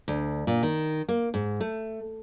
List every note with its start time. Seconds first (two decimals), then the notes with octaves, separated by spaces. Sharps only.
0.08 D2
0.47 A#2
0.63 D#3
1.08 A#3
1.34 G#2
1.60 A3